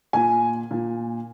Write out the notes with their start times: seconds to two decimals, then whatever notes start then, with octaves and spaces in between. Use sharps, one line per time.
0.13 A#2 G#5
0.71 A#2